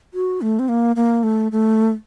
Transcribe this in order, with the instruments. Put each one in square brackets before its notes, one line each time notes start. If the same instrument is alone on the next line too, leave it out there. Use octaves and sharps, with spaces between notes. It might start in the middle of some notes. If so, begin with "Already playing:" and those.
[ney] F#4
A3
C4
A#3
A#3
A3
A3